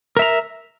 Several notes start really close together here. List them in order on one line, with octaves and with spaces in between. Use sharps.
A#4 E5 A#5